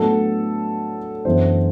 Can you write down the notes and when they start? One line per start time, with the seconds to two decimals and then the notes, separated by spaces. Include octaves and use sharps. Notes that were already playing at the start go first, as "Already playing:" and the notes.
Already playing: A2 F#3 B3 D4 A4
1.25 F#2 E3 B3 D4 C5